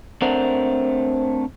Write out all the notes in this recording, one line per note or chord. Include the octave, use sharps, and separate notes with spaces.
A3 C4 D4 A#4 C5 F#5